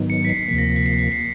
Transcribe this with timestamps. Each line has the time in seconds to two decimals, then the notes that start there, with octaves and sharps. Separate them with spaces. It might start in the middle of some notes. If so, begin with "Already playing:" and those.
Already playing: G#2 D#3 F#3 B3 D#4
0.10 C#7
0.25 B6
0.29 C7
0.48 D2 C3 F3 A#3 B6
0.58 A#6
0.76 B6
0.86 C7
0.99 B6
1.12 C7